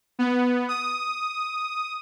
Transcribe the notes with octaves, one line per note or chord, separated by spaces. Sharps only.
B3
D#6